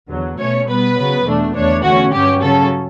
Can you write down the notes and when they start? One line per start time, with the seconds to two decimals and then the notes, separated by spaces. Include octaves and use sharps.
0.11 E2 D3 F#3
0.39 B2 A3 C#4 C#5
0.68 B2 G3 B3 B4
0.98 C#3 F#3 B3
1.26 E2 B2 A3 D4
1.55 E2 D3 A3 D4 C#5
1.83 E2 D3 A3 C#4 F#4
2.13 G2 F#3 C#4 G4
2.42 C#3 F#3 C#4 A4